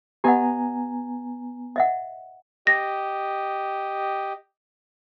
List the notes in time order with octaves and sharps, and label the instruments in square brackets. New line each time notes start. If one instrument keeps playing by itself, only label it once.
[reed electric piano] B3 G#5 A#5 [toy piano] G4 D#5 F#5
[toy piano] D#5 E5 F#5
[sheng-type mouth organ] G4 D#5 [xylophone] A#6